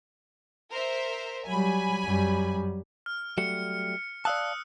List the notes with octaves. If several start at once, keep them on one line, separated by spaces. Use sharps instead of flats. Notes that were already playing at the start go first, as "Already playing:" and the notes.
A#4 C5 E5
F#3 G3 G#5 B5
F#2 G3
F6
F#3 G3 A3 C#7
D5 F5 A5 D#6 E6 F#6